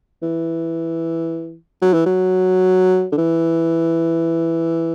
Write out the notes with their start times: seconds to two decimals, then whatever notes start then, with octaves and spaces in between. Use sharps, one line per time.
0.22 E3
1.82 F#3
1.93 E3
2.06 F#3
3.12 D3
3.17 E3